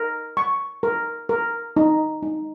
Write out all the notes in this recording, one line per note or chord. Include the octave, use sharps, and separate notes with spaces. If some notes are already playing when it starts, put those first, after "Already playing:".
Already playing: A#4
C#6
A#4
A#4
D#4
D#4